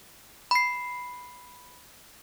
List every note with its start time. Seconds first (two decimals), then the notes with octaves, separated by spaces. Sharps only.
0.51 B5 C7